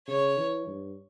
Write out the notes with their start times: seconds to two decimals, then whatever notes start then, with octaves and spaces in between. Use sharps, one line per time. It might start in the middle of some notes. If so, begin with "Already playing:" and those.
0.08 C#3 C#5
0.37 E3
0.67 G2